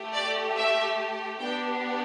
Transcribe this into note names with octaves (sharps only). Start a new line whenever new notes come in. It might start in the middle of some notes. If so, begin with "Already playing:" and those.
Already playing: A3 G4
D5
E5
B3 D4 G4 G5